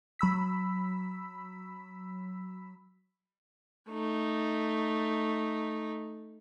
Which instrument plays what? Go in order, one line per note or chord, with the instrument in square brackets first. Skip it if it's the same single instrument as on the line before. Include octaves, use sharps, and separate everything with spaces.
[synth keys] F#3 B5 E6 B6
[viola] A3 D#4